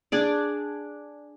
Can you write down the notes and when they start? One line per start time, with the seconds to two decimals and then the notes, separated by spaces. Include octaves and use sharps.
0.12 D4 G#4 D5